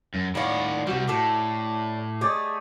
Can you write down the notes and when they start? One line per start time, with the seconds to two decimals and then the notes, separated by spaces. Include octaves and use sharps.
0.14 F#2
0.35 A2 D#3 F4 D5 F#5
0.87 C3 G3 F#4 G4 E5
1.08 A2 D4 G4 A4
2.21 A3 G4 G#4 D5 D#5